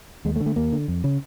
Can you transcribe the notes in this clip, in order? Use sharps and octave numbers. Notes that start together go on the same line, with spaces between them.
D#2 G#3
A3
D3
A3
D#2 A#3
D3
F2
C#3